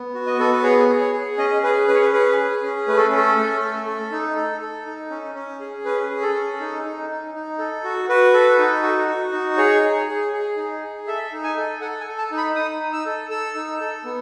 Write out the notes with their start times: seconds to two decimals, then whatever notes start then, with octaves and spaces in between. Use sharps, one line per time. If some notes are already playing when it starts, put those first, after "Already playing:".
Already playing: B3
0.14 F#4
0.27 D#5
0.38 B3 A4
0.52 B4
0.63 G#4 C#5
0.88 G#4
1.00 C#5
1.13 G#4
1.37 C#4 D#5
1.62 G#4 B4
1.88 C#4 B4
1.94 C#5
2.02 B4
2.13 G#4 B4
2.37 G#4
2.62 C#4
2.87 A3 B4
2.97 A4
3.11 C#4 A4
3.37 A3
3.61 A4
3.86 A4
4.12 D#4
4.36 A4
4.61 A4
4.86 D#4
5.10 C#4
5.35 C#4
5.60 G#4
5.85 C#4 B4
6.09 G#4
6.22 A4
6.35 C#4
6.60 D#4
6.84 D#4
7.10 D#4
7.34 D#4
7.58 A4
7.84 F#4
8.09 F#4 B4
8.34 A4
8.58 D#4
8.83 F#4
9.07 F#4
9.32 D#4
9.57 G#4 C#5
9.83 G#4
10.08 G#4
10.33 G#4
10.57 D#4
10.83 G#4
11.07 A4 E5
11.32 D#4
11.43 G#5
11.57 A4
11.81 A4 F#5
12.01 G#5
12.06 A4
12.18 A5
12.31 D#4
12.37 B5
12.55 D#4 D#6
12.80 D#4
12.93 E6
13.06 A4
13.30 A4 E6
13.55 D#4
13.80 A4
14.04 B3